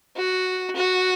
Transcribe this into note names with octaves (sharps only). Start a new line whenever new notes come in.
F#4
F#4